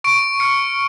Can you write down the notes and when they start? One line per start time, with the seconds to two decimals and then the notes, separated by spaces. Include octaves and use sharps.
0.04 C#6 D7
0.40 F6 C#7